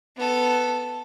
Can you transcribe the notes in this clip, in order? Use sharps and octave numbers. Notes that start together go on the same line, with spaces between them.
B3 A4